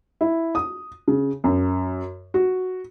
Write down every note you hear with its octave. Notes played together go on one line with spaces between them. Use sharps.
E4
D#6
C#3
F#2
F#4